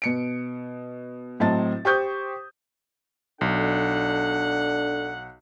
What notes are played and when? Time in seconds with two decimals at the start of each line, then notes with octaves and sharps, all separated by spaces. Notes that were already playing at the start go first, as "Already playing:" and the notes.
0.02 B2 C#7 D7
1.40 A2 F#3 C4 D#5 A5 A6
1.85 G4 C5 C#6 D#6 G6
3.41 B1 D4 A4 F#5